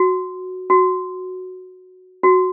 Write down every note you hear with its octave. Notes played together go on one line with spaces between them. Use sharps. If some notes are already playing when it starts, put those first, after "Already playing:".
Already playing: F#4
F#4
F#4